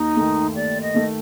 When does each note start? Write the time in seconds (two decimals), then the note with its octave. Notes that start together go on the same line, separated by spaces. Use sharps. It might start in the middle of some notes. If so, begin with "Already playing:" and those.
Already playing: D#2 D#4
0.17 D#3 A3
0.55 D#2 D5
0.81 D#5
0.94 D#3 A3